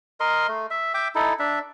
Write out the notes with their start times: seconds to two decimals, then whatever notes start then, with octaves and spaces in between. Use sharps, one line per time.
0.20 A#4 D#5 C6
0.48 A3
0.71 E5
0.94 E5 G5 D6
1.15 D#4 E4 A4
1.39 D4 E5